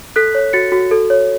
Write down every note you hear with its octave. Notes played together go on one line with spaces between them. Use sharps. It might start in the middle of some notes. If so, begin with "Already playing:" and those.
A4 F#6 B6
C#5
F#4 A6 C#7
F#4
A4
C#5